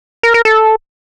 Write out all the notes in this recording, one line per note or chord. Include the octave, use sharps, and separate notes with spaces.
A#4
A#4
A4